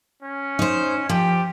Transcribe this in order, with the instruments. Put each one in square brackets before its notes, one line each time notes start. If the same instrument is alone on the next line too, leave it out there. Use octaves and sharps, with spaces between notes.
[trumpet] C#4
[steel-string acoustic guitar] D#4 C5
[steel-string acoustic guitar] F3 [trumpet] G4